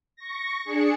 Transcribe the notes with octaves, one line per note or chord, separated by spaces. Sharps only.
C#6 A#6
D4 G#4 C#7